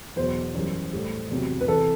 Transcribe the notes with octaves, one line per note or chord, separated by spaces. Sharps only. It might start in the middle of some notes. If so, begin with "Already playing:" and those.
E2 B2 F#3 C5
F#2 E3 G3
A2 G3
E2 C3 F#3
B4
C3 E3 A4